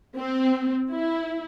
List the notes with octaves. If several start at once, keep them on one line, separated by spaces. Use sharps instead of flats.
C4
E4